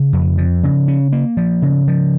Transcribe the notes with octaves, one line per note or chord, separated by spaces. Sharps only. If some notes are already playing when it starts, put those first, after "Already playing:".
Already playing: C#3
F2
F3
C#3
C#4
A#3
F3
C#3
F3